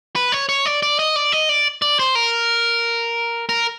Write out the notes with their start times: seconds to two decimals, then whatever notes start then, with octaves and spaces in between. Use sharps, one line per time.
0.16 B4
0.32 C#5
0.49 C#5
0.66 D5
0.83 D5
0.99 D#5
1.16 D5
1.32 D#5
1.49 D5
1.82 D5
1.99 C5
2.15 A#4
3.49 A#4